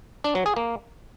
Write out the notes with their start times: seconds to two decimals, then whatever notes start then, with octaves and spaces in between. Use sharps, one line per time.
0.24 D4
0.35 F#3
0.46 G#4
0.56 A#3